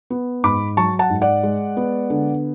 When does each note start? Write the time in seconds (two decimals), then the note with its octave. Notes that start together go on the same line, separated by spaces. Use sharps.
0.10 B3
0.44 G#2 B5 D6
0.77 F#3 A5 C#6
0.99 F#5 A5
1.10 G#2
1.22 D5 F#5
1.43 G#3
1.77 B3
2.10 D3